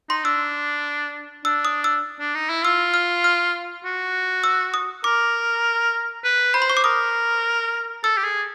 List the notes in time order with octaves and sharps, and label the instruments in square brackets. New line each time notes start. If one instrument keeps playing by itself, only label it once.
[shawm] D#4 [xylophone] C6
[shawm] D4 [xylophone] E6
[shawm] D4 [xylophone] E6
[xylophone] D#6
E6
[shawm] D4
D#4
E4
[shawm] F4 [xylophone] E6
[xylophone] F6
F6
[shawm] F#4
[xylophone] E6
D#6
[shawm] A#4 [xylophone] D6
[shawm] B4
[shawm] C5 [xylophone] B5
[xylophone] C6
C#6
D6
[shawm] A#4 [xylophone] D#6
[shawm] A4 [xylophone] E6
[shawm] G4
G#4